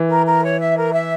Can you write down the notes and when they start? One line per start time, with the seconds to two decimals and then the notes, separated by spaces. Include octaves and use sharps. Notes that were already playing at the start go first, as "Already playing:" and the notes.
Already playing: E3
0.10 A#4
0.26 A#4
0.44 C#5
0.60 E5
0.77 A#4
0.93 E5